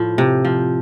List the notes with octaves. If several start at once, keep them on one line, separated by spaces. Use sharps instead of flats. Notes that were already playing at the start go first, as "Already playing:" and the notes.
Already playing: A2 F3
C3
F3